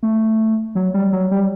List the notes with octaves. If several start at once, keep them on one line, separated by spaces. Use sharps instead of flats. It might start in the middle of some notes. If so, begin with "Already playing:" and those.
A3
F#3
G3
F#3
G3